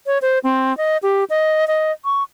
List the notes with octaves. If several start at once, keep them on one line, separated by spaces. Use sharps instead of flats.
C#5
C5
C4
D#5
G4
D#5
D#5
C#6